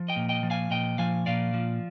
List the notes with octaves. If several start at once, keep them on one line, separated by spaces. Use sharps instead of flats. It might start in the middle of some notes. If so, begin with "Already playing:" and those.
Already playing: F3
D#5 G5
A#2
D#5 G5
F3
F5 G#5
A#2 D#5 G5
F3 F5 G#5
A#2 D5 F5
F3